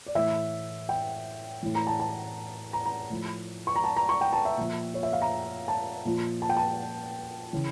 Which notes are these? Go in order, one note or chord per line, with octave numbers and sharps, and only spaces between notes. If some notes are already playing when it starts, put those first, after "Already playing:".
D5
A2 E3 E5
G5
A2 E3
A#5
A5
A5
A#5
A#5
A2 F3
C#6
A#5
A5
A#5
C#6
G5
A5
E5
A#2 F3
C#5
E5
F5
A#5
A5
A#2 F3
A5
G5
A5
C#3 E3